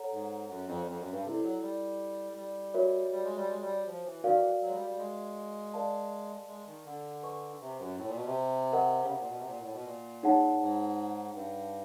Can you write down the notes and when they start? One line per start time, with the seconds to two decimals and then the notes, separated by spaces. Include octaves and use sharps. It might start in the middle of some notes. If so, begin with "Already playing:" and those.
Already playing: A4 C#5 F#5 A#5
0.11 G#2
0.49 F#2
0.67 F2
0.86 F2
0.99 F#2
1.12 G2
1.24 C3 E4 A4 D5
1.43 F#3
1.61 G3
2.36 G3
2.74 F#4 A#4 C#5 E5
3.11 G3
3.24 G#3
3.36 G3
3.49 G#3
3.61 G3
3.87 F3
4.05 E3
4.24 D#3 F#4 A#4 D5 F5
4.36 E3
4.61 F#3
4.69 G#3
4.74 G3
4.86 G3
4.98 G#3
5.74 A#4 D5 F5 A5
6.48 G#3
6.67 D#3
6.86 D3
7.23 B4 D#5 G#5 C#6
7.61 C3
7.79 F#2
7.98 A2
8.08 A#2
8.16 B2
8.26 C3
8.73 A#4 D#5 F#5
9.03 C#3
9.10 C3
9.20 A#2
9.29 B2
9.39 C3
9.48 A#2
9.60 A2
9.73 B2
9.85 A#2
10.23 D#4 G#4 C#5 F#5 A5
10.60 G#2
11.34 G2